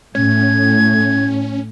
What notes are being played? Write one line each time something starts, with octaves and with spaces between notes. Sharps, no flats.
A2 C#4 G#6